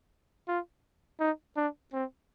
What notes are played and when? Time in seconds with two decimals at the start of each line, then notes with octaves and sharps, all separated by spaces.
0.48 F4
1.20 D#4
1.56 D4
1.93 C4